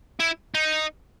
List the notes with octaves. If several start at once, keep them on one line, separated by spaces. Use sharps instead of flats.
E4
D#4